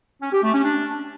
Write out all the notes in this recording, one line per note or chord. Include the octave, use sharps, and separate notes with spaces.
C#4
G4
A3
C#4
D4